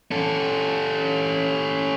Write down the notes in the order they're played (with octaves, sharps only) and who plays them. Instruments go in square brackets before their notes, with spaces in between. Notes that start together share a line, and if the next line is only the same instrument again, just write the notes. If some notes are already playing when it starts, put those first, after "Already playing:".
[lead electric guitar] C#4 A4